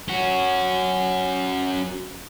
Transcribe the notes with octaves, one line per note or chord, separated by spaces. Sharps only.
C#4 F#4